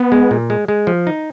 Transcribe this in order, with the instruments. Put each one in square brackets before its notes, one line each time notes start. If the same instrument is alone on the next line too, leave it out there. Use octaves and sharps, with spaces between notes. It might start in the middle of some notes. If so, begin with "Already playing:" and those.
Already playing: [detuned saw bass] B3
[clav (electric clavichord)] G#3
A#2
G#3
G#3
F3
D#4